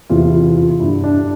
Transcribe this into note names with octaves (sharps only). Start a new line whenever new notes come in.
E2 C3 E3 F4
F4
F4
G2 D3 E4
D4